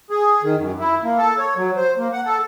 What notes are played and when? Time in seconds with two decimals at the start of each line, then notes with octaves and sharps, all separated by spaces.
0.10 G#4
0.43 D#3
0.58 F#2
0.79 E4
1.04 A#3
1.18 A4
1.39 C#5
1.56 F#3
1.77 C5
1.97 A#3
2.13 F#5
2.26 A4